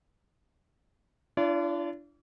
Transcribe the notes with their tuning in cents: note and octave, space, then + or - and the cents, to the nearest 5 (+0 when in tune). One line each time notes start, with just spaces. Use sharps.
D4 +0 F4 -45 D5 -40